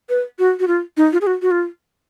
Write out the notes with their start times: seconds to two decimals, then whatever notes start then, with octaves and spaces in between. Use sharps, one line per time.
0.09 B4
0.39 F#4
0.60 F#4
0.67 F4
0.97 D#4
1.13 F4
1.21 G#4
1.27 F#4
1.42 F#4
1.51 F4